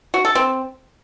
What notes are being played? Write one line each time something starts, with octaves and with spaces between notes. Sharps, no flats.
F#4
A4
C4